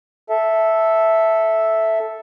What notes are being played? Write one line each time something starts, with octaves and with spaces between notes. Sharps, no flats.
A4 E5